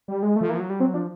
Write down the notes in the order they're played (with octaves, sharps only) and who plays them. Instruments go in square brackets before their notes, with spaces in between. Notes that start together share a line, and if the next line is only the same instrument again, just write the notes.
[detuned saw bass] G3
G#3
[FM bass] F3 [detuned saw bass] A3
[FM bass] E3 [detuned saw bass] A#3
[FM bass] F3
F#3
G3
[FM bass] F#3 [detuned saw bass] C4
[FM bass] F3 [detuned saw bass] D4